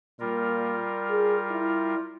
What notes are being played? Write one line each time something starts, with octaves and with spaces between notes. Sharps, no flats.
A#2 G3 F4 A#4
G#4
E4